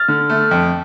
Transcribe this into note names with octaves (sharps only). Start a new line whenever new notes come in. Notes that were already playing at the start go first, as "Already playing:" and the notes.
Already playing: F6 A6
D3
A3
F2